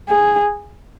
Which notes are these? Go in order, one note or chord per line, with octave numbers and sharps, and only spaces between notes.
G#4